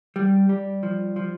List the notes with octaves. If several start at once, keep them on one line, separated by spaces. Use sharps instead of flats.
G3
G3
F3
F3